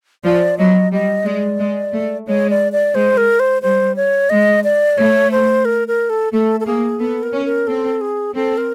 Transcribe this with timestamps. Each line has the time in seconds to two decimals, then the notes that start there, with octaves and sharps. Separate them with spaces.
0.25 F3 D5
0.58 F#3 D#5
0.92 G3 D#5
1.26 G#3 D5
1.59 G#3
1.93 A3
2.27 G#3 C#5
2.50 D5
2.72 D5
2.95 G#3 C5
3.17 A#4
3.40 C5
3.62 G3 C5
3.96 C#5
4.30 G#3 D#5
4.64 D5
4.98 A3 C#5
5.32 C5
5.65 A#4
5.88 A#4
6.10 A4
6.33 A3 A4
6.60 A4
6.66 A#3 G#4
7.00 B3 A4
7.23 A#4
7.33 C#4
7.45 A#4
7.67 C4 A4
8.01 G#4
8.35 C4 A4
8.58 A#4